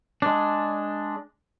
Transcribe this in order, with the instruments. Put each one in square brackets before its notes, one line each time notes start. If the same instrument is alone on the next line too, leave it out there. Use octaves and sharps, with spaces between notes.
[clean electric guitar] G#3 D4